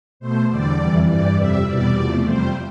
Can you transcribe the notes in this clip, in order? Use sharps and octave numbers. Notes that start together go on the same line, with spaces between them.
B2 A3 C5
E2 D3 G3 D5
F2 C3 E3 G3
G2 E3 G3 D5
F2 C3 G3 E5
E2 B2 G3 D5
E2 C3 F3 A3
F2 C3 G3 C5